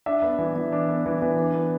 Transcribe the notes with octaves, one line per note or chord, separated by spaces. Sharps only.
D4 E5
B3
E3
E3
D4
B3
E3
E3
D4
B3